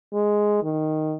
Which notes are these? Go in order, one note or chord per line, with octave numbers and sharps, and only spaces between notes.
G#3
D#3